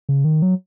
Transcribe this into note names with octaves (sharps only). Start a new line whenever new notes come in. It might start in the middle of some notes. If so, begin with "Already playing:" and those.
C#3
D#3
F#3